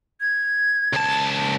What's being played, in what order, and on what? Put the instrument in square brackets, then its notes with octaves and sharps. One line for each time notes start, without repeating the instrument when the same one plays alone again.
[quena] G#6
[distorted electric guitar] C#2 A5